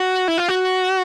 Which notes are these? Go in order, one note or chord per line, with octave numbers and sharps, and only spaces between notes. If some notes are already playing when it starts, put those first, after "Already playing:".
Already playing: F#4
E4
F4
F#4